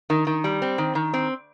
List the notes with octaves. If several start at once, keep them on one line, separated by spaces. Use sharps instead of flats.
D#3
D#3
G3
C4
D#3
D#3
C4